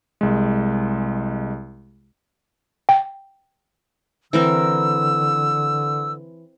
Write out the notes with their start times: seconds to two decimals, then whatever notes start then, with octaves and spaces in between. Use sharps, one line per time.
0.21 C2 G#3
2.89 G5
4.33 D3 E3 C4 A#4 E6